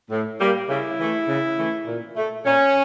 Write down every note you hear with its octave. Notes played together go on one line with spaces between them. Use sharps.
A2
G3 A#3
C#3 E4
E3 A3
C#3
E3 A3
A#2
A3
A#2 C#4